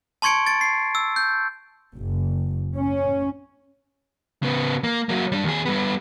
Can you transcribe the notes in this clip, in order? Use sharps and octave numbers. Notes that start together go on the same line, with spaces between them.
A5 C6 C#6 G#6 C#7 D7
A6 D7
C7
E6
G6
F#1
C#4
C#3 B3
A#3
F#3 A#3
G3 D4
D#2 G#4
G3 B3